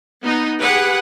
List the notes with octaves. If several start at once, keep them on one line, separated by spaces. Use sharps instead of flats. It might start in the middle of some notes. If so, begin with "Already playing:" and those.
B3 D#4
G4 G#4 B4 F#5